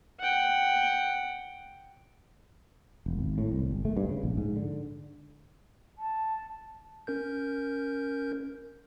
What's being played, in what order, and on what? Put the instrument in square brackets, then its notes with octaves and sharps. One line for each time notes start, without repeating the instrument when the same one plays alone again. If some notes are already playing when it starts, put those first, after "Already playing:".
[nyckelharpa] F#5 G5
[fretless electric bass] E1
G#1
A2
C2
G1
A3
G2
C#3
A#1
G#2
D3
[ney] A5
[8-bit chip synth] C#4 A#4 G6